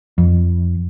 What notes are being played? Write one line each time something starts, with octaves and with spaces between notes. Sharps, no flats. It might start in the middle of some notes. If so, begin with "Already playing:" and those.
F2